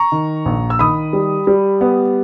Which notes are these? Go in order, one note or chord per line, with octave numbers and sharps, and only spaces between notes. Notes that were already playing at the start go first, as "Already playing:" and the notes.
Already playing: A#5 C#6
D#3
A#1
E6
D#3 B5 D#6
G3
G3
B3